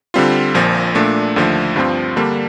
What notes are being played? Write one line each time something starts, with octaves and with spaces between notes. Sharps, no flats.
D3 G3 C4 F4
A#1 A#2 F3
A#2 A3 D4
D#2 D3 F3 A3
G2 F3 C4 F4
D3 G3 A#3 D4